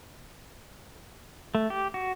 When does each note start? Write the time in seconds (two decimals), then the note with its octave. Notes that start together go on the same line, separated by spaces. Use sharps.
1.55 A3
1.70 G4
1.94 F#4